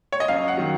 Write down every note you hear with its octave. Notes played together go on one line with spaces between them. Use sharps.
C#5
D#5
F#2 F5
F#5
D#3 F#3